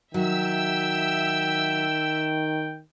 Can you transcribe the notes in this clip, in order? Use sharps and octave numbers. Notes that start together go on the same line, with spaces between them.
D#3 F#3 E5 G5 E6